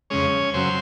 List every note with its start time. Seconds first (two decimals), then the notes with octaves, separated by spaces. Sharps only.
0.10 F2 C#3 G#3 C#4 C#5
0.54 F#2 C#3 F#3 C4 C5